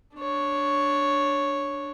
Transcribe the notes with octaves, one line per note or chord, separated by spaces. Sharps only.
D4 C#5